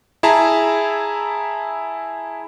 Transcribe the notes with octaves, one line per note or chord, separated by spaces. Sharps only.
E4 G#4 E5 A5 A#5